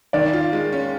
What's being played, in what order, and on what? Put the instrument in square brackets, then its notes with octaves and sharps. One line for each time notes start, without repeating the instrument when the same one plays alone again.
[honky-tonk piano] D#3 [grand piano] D5
[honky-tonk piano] F4
G#3
C#4